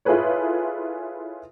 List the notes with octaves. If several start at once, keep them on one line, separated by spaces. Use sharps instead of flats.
E4 F4 G#4 A4 B4 C#5